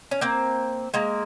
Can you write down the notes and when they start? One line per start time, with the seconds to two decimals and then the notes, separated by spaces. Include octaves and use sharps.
0.11 C#4
0.21 A#3 C4
0.94 G#3 A#3